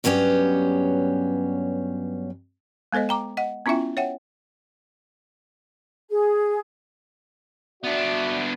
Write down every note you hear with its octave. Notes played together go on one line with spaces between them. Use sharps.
G2 F#3 B3 C#4 G4
G#3 B3 A4 C5 D#5
G5 A#5 D6
D#5 F#5
B3 C#4 E4 F4 E5 G5
C#5 E5 F#5 G5
G#4
B3 D4 F#4 D5 E5